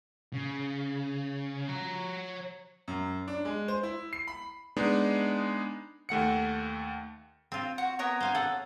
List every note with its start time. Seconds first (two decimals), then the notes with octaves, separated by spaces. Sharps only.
0.33 C#3
1.69 C#5 A#5
2.88 F#2
3.28 D4
3.45 G#3
3.68 C5
3.83 E4
4.13 C7
4.27 B5
4.77 G#3 B3 D4 D#4
6.09 D#2 A3 F#5 C#7
7.52 C4 F4
7.78 F#4
7.99 B3 A#4 C#5
8.20 C5 F5 G#5
8.35 A4 F#5